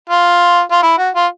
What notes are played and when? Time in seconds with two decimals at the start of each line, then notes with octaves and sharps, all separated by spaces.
0.10 F4
0.71 F4
0.83 E4
0.98 F#4
1.15 F4